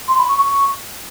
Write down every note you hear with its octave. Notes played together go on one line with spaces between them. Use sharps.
C6
B5
C#6
C#6